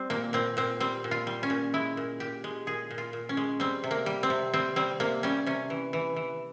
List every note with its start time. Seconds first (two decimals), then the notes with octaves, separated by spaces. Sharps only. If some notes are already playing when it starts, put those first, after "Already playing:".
Already playing: G3 C4
0.10 A#2 A#3
0.33 A#2 C4
0.57 A#2 C4
0.80 G3 C4
1.04 A#2
1.11 F4
1.27 G3
1.43 C#4
1.50 A#2
1.74 G#3 E4
1.97 A#2
2.20 A#2 G4
2.44 G#3
2.67 A#2 G#4
2.91 A#2
2.98 F4
3.13 A#2
3.29 C#4
3.37 G#3
3.60 G3 C4
3.84 C3
3.91 A#3
4.06 G3
4.23 C4
4.30 C3
4.53 G3 C4
4.76 G3 C4
5.00 C3 A#3
5.23 G3 C#4
5.46 C3 C#4
5.70 E3
5.93 E3
6.16 E3